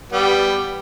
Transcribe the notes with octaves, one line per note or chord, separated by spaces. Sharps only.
G3 B3 G5